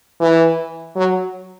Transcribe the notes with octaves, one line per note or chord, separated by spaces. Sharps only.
E3
F#3